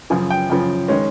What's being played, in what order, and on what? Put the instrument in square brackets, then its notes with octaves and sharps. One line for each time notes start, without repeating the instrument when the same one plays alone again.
[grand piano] F#2 C#3 F3 G#5
G5
F#2 C#3 F3
D#3 G#3 C#4